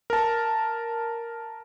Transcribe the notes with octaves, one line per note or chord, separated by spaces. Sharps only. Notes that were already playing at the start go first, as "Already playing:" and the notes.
A#4 A5